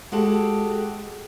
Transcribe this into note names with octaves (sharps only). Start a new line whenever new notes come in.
G#3 F#4 G4 A4